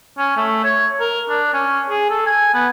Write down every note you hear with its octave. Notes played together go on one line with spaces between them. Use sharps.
C#4
A3
C#5
A#4
D4
C#4
G#4
A4
G#5
B3